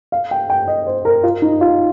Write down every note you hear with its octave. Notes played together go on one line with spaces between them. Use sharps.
F5
G5
G5
D#5
C5
A#4
F4
D#4
F4